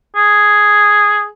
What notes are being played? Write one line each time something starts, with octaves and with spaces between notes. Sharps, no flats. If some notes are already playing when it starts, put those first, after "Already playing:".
G#4